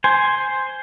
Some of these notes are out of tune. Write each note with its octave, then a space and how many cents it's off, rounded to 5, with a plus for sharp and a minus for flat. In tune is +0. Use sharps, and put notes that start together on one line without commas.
C5 +0 G#5 +0